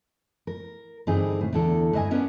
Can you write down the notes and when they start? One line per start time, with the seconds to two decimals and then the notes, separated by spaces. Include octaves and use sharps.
0.47 A#4
1.07 G2 D3 E3 C4 D#4 G#4
1.41 A2
1.53 E2 D3 A4
1.93 G2 A#3 D#5 E5 G#5
2.11 B3 C#4 D4 A#4